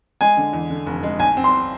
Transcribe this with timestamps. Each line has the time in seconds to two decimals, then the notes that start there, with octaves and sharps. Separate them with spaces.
0.21 G#3 G#5
0.37 D3
0.53 E2
0.70 D3
0.86 F1
1.03 G#3
1.19 B1 G#5
1.37 C4
1.44 C6